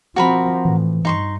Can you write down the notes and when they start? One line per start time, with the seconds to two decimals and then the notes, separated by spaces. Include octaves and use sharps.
0.16 F3 C4 F#4 A#4 B5
0.65 A2 E3
1.05 G2 D#4 C6 C#6